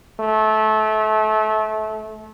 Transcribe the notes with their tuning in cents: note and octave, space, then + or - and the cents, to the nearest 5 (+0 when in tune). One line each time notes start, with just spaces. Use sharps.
A3 -25